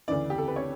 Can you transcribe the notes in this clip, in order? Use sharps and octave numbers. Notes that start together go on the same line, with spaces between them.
D2 C#3 E3 D5
G4
A4
B4
C#5